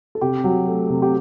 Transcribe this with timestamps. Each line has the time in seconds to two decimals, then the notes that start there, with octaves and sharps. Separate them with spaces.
0.15 A4
0.21 C3 G4
0.44 F#3
0.67 A3
0.90 C3
1.02 G4